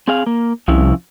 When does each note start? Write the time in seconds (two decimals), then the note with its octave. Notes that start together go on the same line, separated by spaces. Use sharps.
0.08 C4 G#4 F5
0.26 A#3
0.68 C2 F3 C#4 E4